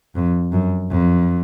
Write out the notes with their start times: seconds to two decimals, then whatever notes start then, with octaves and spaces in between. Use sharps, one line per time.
0.15 F2
0.52 F#2
0.91 F2